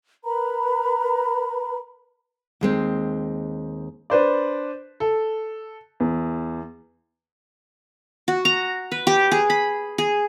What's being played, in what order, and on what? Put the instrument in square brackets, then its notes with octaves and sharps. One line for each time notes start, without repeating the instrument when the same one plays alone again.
[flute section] A#4 B4 A#5 B5
[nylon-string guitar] D#2 G#3 C4
[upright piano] D4 B4 C5 D5
A4
E2
[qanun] F#4
A#5
B4
G4
G#4
B5
G#4